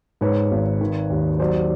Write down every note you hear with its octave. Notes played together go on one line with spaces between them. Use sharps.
G#2 B4 C#5
G#1
D#3
D#2
F#3 C5 D5